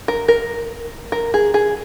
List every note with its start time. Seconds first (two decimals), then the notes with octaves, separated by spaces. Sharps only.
0.08 A#4
0.28 A#4
1.12 A#4
1.34 G#4
1.54 G#4